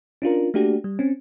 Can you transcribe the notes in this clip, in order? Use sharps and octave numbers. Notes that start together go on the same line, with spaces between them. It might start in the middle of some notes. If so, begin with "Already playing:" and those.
C#4 D4 F4 A#4
A3 A#3 D4 F#4 G4
G3
C4 C#4